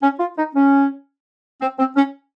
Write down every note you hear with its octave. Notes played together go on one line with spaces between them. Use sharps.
C#4
F4
D#4
C#4
C4
C4
C#4